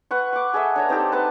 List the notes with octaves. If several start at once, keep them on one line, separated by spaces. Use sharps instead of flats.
B4 F#5 C#6
C#6 D6
G#4 A4 D#5 E5
D4 C#5 A#5
C4 D#4 G4 A4
B4 F#5 A5